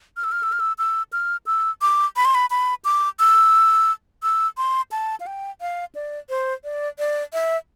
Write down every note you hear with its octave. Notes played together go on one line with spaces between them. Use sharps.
F6
E6
F6
E6
F6
E6
E6
F6
E6
D6
B5
C6
B5
B5
D6
E6
E6
C6
A5
F5
G5
F5
D5
C5
D5
D5
E5